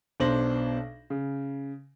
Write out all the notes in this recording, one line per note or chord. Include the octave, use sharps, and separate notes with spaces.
B1 B2 D4 C5 A#6 F#7
C#3